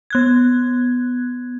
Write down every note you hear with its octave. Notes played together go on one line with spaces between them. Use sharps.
B3 F#6 G#6